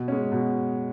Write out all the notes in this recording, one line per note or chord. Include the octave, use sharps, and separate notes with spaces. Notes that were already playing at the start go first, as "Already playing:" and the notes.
Already playing: B2
G#3 C#4
B2